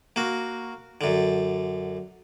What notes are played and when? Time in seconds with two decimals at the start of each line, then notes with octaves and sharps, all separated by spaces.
0.16 A#3 F#4
1.01 F#2 D3